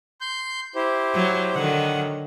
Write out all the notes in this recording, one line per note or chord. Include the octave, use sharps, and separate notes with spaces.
C6 G6
E4 G4 C5
F#3
D3 D#3 F#3 F#5